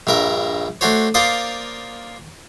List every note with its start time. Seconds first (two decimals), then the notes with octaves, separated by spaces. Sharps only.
0.07 A#1 G2 A#4 E5
0.81 A3 D4 F#4 C5 C#5
1.14 A#3 F4 C5 D5 C6 D#6